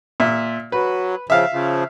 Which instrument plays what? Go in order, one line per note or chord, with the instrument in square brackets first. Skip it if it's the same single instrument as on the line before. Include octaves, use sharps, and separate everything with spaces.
[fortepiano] A#2 E5
[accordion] F#3 [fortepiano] B4
[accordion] C#3 F3 [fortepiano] E5 F5
[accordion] C#3 F3